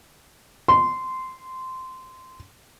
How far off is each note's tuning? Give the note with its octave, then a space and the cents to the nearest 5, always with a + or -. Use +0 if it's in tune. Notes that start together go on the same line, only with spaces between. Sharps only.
C6 -15